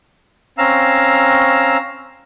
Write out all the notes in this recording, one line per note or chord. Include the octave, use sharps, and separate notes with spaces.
C4 C#4 F5 A#5 E6